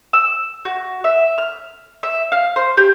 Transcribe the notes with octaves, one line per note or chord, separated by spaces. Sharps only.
E6
F#4
E5
F6
E5
F5
C5
G4